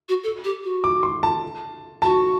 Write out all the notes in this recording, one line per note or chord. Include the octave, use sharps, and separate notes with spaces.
F#4
A4
G4
F#4
D6
C6
A5
F#4 A5